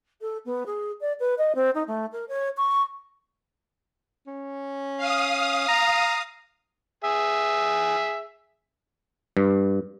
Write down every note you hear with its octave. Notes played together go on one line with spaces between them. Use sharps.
A4
B3
G#4
D5
B4
D#5
C4
D#4
A3
A#4
C#5
C#6
C#4
F5 D#6
A#5
G#4 E5
G2